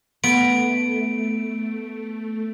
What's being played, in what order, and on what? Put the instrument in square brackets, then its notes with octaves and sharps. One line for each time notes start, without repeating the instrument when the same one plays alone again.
[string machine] A3 [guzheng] B3 [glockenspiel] D7